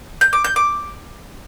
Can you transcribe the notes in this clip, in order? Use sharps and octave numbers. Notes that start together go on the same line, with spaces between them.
G6
D6
G6
D6